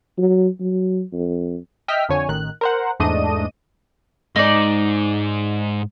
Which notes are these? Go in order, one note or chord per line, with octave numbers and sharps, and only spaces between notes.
F#3
F#3
F2
D#5 E5 G5 F6 B6
F2 D3 C#5 G#5
A1 D#3 F#6
A#4 C5 F#5
E2 G#2 A3 D4 D#5 D#7
G#2 G#3 D#4 D5